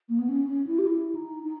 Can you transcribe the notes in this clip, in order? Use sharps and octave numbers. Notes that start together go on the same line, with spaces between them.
A#3
B3
C#4
C#4
E4
G4
E4
D#4
D#4